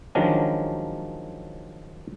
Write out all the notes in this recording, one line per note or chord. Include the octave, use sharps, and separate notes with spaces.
D#3 F3 F#3 G#3 C#4 D4